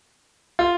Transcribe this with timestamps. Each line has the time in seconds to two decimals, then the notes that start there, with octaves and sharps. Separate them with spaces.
0.59 F4